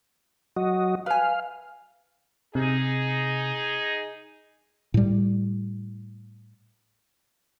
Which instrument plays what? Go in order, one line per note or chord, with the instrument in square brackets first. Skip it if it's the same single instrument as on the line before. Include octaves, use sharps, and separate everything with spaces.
[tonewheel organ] F#3 F#4 D#5
[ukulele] B4 G#5 [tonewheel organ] F5
[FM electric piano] C3 [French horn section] D#4 G#4
[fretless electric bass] A2 G3